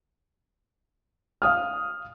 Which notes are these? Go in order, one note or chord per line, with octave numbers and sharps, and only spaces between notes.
F5 D#6 F6